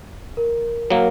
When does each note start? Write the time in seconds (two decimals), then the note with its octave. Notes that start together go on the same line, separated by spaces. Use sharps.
0.37 A#4
0.90 F#3 A#3